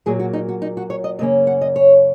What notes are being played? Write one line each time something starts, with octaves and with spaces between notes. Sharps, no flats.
A#2 F#3 A#3 G#4
F#4
D#4
F#4
D#4
F#4
C#5
D#5
F#2 C#3 A#3 C#4 D#5
F#5
D#5
C#5